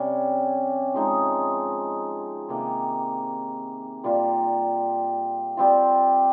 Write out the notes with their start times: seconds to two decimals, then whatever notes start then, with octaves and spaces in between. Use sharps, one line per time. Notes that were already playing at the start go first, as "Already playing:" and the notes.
Already playing: C3 G3 C#4
0.94 F3 G#3 D#4
2.49 C3 D#3 A#3
4.04 A#2 G3 A#3 F4
5.57 G3 C4 F4